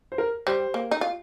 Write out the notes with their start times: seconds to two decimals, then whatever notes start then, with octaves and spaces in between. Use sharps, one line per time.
0.12 C5
0.18 A#4
0.47 G3 C5
0.74 A#3
0.91 D#4
1.01 F4